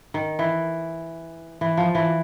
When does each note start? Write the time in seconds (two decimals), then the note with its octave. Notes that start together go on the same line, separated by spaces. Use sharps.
0.14 D#3
0.39 E3
1.61 E3
1.77 F3
1.95 E3